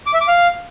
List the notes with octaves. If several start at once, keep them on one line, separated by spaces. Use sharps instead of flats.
D6
E5
D6
F5